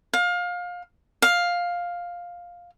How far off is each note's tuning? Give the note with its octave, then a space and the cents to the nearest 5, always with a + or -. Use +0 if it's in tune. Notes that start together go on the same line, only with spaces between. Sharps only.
F5 +25
F5 +10